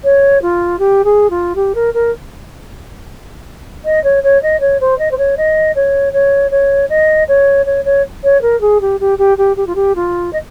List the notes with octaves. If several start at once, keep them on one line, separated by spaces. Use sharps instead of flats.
C#5
F4
G4
G#4
F4
G4
A#4
A#4
D#5
C#5
C#5
D#5
C#5
C5
D#5
C5
C#5
D#5
C#5
C#5
C#5
D#5
C#5
C#5
C#5
C#5
A#4
G#4
G4
G4
G4
G4
G4
F4
G4
F4
D#5